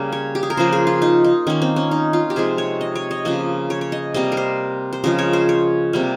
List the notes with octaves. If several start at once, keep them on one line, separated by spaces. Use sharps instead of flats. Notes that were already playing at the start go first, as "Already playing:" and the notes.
Already playing: C#3 G3 A#3
C#5
G4
G#4
A#4
C#3 F3 A#3 C5
G#4
F4
D#4
D#4
D#3 A#3 C#4
C4
C#4
D#4
F4
G4
C3 F3 G#3 G#4
C#5
D#5
C#5
D#5
C#3 F3 A#3 D#5
C#5
C#5
D#5
C3 G3 A#3 D#5
A#4
C5
C5
C#3 F3 G#3 A#4
C#5
C5
C#5
C3 G3 A#3